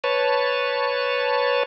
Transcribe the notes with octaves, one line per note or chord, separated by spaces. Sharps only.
B4 C#5 A5